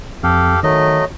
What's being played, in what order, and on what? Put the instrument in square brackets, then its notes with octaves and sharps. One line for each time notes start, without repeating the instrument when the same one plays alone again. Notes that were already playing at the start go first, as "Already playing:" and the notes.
[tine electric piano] F2 [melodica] G4 A4 F5
[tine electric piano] D#3 [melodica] F#3 A3 D#5